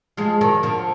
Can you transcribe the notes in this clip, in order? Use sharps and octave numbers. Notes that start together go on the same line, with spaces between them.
F3 G#3
D#3 F#3
D3 F3